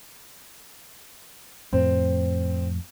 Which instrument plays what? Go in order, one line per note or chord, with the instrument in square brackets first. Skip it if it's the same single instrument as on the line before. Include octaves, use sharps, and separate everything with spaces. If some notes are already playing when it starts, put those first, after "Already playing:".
[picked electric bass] F2 A2 [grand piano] C4